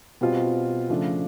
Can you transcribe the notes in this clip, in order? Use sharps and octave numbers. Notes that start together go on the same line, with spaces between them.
B2 G3 C4 F4
C#3 F3 A3 D4